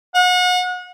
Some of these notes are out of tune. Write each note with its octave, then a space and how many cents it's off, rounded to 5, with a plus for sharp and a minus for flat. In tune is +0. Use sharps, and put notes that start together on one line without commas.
F#5 -35